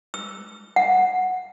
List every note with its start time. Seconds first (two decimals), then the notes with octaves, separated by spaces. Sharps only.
0.14 E6
0.76 F#5